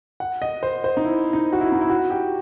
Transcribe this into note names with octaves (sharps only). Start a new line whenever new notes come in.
F#5
D#5
C5
C5
D#4
E4
D#4
F#4
E4
D#4
E4
F#4
G4